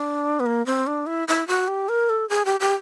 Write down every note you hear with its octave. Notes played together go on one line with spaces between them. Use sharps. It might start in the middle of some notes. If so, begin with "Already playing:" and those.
Already playing: D4
B3
A#3
C4
D4
E4
E4
F#4
G4
A#4
A4
G#4
G4
G4